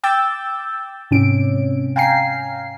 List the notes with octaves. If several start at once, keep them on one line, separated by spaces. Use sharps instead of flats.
G5 D6 E6 G6 A6
G#2 C3 C#4 D7
F5 G5 G#5 A#5 C7